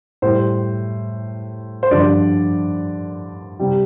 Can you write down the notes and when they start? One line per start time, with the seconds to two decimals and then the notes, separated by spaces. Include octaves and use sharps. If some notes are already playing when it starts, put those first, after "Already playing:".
0.22 A2 G3 C5
1.83 C5
1.91 G2 D3 F3 D5
3.59 C3 G3